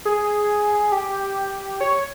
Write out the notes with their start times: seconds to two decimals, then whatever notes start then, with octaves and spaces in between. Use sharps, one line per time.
0.05 G#4
0.92 G4
1.81 C#5